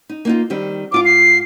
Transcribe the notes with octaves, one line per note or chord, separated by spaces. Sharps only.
D#4
A#3 D#4 F4
D#3 G3 C4
G#2 F4 F5 D6
C7